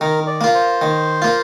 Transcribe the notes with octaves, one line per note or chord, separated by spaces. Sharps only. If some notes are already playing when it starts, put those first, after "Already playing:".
D#3 A#4
D5
A#3 F4
C5
D#3
A#3 F4